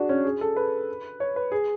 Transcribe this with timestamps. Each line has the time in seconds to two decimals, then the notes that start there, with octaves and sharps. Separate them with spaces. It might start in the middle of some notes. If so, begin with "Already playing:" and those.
Already playing: D4 F#4 G#4
0.09 C#4
0.25 G#4
0.41 A4
0.56 B4
1.20 C#5
1.36 B4
1.52 G#4